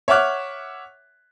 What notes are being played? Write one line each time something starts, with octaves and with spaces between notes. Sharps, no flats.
C#5 E5 F#5 D6 F6 F#6